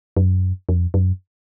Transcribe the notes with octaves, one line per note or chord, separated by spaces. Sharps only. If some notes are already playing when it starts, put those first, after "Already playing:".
F#2
F2
F#2